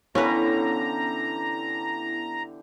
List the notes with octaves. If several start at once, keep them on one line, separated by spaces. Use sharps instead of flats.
D3 E3 B3 C#4 E4 G4 B4 A#5